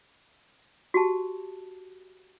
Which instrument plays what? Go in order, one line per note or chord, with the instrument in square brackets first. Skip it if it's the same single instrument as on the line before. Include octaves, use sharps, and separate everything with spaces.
[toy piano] F#4 G4 A5